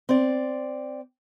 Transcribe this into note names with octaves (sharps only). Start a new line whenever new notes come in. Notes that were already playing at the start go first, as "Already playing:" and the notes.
C4 D5